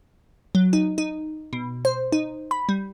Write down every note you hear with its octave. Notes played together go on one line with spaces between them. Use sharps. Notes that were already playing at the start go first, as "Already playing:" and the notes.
F#3
D#4
D#4
B2
C5
D#4
B5
G3